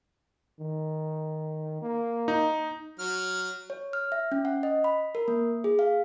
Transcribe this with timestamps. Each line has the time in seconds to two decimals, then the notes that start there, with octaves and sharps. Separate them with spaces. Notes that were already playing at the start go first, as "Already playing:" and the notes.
0.59 D#3
1.82 A#3
2.28 D#4
2.99 F#3 F6
3.70 C#5
3.93 F6
4.12 E5
4.32 C#4
4.45 F#5
4.63 D#5
4.84 B5
5.15 A#4
5.28 A#3
5.64 G#4
5.79 F5